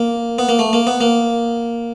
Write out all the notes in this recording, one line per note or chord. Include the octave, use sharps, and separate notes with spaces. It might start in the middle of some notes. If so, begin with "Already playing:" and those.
Already playing: A#3
B3
A#3
A3
A#3
B3
A#3